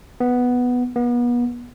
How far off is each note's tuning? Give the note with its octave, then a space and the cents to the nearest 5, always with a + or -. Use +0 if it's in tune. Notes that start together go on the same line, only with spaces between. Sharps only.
B3 +0
B3 -35